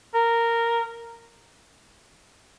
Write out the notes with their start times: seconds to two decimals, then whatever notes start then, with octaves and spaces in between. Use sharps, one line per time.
0.14 A#4